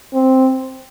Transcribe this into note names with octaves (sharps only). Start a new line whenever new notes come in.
C4